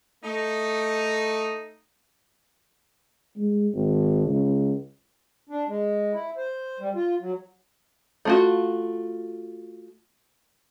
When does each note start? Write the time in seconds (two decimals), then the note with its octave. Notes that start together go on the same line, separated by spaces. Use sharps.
0.23 A3 D#4
3.37 G#3
3.74 G#1
4.26 C#2
5.49 D4
5.68 G#3
6.14 E4
6.37 C5
6.80 G3
6.95 F4
7.20 F#3
8.25 A3 F4 F#4